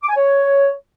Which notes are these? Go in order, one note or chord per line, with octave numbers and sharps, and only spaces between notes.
D6
G#5
C#5